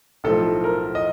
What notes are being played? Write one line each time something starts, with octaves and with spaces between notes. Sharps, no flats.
B1 A2 F3 A4
A#4
D#5